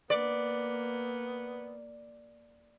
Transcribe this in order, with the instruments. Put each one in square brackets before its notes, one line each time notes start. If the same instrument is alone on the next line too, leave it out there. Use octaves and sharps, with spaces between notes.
[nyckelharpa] A#3 [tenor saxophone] B3 [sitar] D5